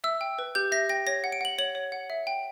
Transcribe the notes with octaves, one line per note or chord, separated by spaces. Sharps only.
E5 E6
G5
B4
G4 G6
E5 A#6
G5 A#6
C#5 A#6
F#5
D7
F#5 F#7
C#5 F#7
C#5
F#5
E5
G5